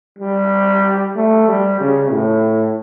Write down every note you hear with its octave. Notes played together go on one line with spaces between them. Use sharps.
G3
A3
G3
C#3
A2